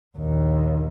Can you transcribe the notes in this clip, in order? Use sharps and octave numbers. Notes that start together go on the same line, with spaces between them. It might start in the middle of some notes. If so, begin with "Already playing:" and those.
A#1 D#2